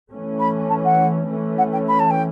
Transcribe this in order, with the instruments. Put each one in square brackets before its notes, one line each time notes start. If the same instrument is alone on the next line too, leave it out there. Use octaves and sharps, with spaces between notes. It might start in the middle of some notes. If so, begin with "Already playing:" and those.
[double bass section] E3 A3 C#4
[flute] B5
A5
F#5
[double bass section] E3 A3 C#4
[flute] F#5
G5
B5
A5
G5